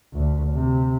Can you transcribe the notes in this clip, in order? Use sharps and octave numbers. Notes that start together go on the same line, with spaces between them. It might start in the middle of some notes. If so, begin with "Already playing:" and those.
D2
C3